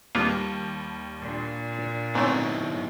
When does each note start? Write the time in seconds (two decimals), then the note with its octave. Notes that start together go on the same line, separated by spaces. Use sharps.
0.15 D#2 G3 A#3 B3 F4 A5
1.21 A#2 D4
2.15 G#2 A3 B3 C4 D#4 E4 C#5